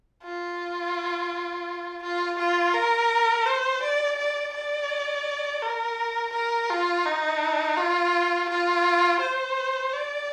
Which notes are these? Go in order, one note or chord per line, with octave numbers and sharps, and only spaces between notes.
F4
F4
F4
A#4
C5
D5
D5
D5
A#4
A#4
F4
D#4
F4
F4
C5
D5